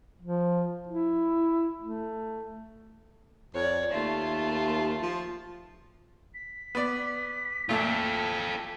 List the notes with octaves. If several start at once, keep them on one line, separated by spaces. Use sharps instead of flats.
F3
E4
A3
F2 C#5 D5
D#2 A3 F4
F3
B6
B3 D5
A#2 A3 F4 A4